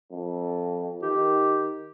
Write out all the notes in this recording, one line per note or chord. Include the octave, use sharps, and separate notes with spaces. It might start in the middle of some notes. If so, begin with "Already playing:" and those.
F2
D#3 G4